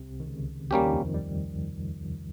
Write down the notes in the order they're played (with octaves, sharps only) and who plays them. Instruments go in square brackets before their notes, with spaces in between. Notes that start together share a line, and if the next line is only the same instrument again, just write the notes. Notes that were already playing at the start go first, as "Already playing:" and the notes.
Already playing: [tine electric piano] C2 C3
D#3
C#2 C#3
[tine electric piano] D#2 D#3 [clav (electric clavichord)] G3 A#3 C#4 G4
[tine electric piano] D#3
F2 F3
G3